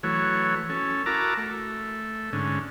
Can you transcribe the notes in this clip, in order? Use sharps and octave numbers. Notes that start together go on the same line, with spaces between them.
E3 F#3 A3 C#5
C#4 A4
E4 F#4 A#4 A5 A#5 D6
A3
G#2 D3 C#4